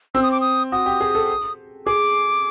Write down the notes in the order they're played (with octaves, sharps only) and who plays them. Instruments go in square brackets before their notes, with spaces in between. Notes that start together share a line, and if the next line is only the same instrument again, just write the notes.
[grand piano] C4 [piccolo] E6
[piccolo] D#6
D6
D#6
[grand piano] F#4 [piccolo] D#6
[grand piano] G4
G#4
A4
[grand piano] G#4 [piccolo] D6